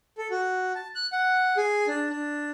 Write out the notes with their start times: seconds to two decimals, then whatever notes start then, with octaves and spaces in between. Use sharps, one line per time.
0.18 A4
0.31 F#4
0.75 A5
0.95 F#6
1.12 F#5
1.57 G#4
1.87 D4
2.10 D4